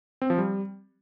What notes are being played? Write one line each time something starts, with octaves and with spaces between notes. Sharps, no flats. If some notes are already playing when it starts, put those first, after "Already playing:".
C4
F3
G3